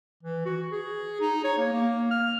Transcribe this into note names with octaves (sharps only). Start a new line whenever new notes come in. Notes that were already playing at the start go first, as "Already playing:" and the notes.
E3
F#4
G#4
D#4
C#5
A#3
A#3
F6